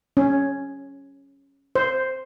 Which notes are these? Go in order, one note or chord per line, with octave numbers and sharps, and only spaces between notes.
C#4
C5